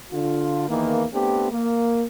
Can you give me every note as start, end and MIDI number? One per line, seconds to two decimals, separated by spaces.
0.12 0.68 50
0.12 0.68 65
0.69 1.04 40
0.69 1.04 51
0.69 1.04 52
0.69 1.04 58
1.14 1.48 57
1.14 1.48 59
1.14 1.48 60
1.14 1.48 62
1.14 1.48 67
1.52 2.04 58